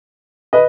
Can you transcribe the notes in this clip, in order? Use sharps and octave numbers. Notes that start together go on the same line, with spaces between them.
B4 D#5